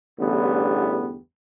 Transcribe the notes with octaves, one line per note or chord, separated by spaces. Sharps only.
A1 E2 G2 D3 B3 G4